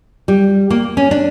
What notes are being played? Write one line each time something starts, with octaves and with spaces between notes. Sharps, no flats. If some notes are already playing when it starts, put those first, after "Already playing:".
G3
A#3
C#4
D4